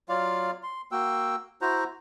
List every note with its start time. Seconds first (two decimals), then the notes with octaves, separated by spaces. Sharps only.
0.09 F#3 F4 D5 F5
0.63 C6
0.92 A#3 F#4 G5 E6
1.61 E4 F#4 C5 A#5